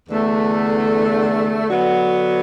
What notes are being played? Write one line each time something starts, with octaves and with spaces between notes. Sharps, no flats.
E2 D3 A3
D3 F#3 B3 F#4